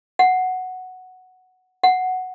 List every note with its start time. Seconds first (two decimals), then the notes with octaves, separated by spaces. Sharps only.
0.19 F#5
1.84 F#5